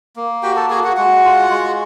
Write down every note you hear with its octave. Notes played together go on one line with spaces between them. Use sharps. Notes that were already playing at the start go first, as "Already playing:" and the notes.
A#3
F#4 G4 G5
A4 A5
F#4 G#4 G#5
F#4 F#5
G#3 F#4 F#5
F4
G#3